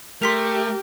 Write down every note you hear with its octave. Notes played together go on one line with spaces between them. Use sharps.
A3 G4 A#4 C6 B6 F7